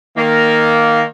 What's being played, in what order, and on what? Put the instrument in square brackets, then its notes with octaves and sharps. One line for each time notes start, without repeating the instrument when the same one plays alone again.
[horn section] D#3 A#3